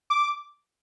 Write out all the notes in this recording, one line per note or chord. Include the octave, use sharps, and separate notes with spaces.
D6